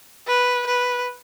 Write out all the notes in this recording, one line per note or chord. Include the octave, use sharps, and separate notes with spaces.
B4
B4